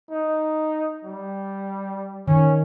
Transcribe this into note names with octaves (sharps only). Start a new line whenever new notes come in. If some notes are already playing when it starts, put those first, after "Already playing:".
D#4
G3
D#3 C#4